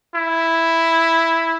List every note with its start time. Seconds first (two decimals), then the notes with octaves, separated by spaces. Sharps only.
0.15 E4